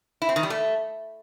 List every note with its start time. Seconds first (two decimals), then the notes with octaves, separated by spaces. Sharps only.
0.22 E4
0.29 C4
0.36 D#3
0.43 G3
0.50 A3